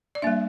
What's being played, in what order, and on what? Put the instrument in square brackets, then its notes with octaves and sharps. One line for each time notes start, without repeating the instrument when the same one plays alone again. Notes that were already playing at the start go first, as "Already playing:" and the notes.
[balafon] D5
G3 A#3 D4 E5